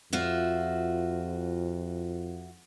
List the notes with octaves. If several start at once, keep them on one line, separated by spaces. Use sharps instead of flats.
F2 F4 F#4 E5